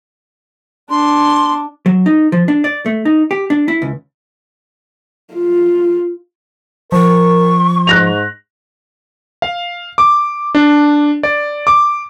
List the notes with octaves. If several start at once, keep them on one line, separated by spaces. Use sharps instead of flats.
D4 C6
F#3
D#4
F3
D4
D5
A3
D#4
G4
D4
E4
C#2
F4
F3 A#4 C#6
G#2 F#6 A#6 F7
F5
D6
D4
D5
D6